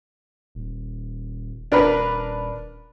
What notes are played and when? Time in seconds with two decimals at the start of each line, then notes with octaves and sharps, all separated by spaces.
0.55 D#1
1.72 D#1 D4 A#4 B4